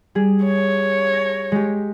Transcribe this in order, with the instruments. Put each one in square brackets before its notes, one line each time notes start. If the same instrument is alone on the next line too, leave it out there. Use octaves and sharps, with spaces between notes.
[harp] G3 G#4
[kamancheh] C#5
[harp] A#6
G#3 G4